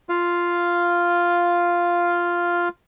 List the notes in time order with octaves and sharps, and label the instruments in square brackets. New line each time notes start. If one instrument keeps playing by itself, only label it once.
[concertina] F4 F5